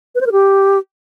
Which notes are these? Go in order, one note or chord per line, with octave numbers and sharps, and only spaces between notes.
B4
C5
A#4
G4